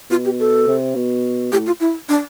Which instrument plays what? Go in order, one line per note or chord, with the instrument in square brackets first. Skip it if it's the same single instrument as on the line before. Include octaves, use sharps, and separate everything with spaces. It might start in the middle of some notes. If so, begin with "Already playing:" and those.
[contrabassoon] B2 [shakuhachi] F4
[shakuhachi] G4
A4
[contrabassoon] C3
B2
[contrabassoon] A2 [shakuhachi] G4
[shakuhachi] F4
E4
D4